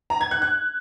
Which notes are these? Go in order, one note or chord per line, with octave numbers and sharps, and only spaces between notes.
A#5
G#6
F#6
F#6